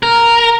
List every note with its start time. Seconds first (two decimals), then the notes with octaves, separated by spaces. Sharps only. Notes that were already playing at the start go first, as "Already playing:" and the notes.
0.03 A#4